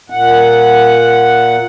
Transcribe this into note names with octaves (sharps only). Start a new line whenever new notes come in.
A#2 F#5